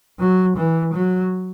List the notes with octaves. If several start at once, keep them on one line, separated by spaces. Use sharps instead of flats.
F#3
E3
F#3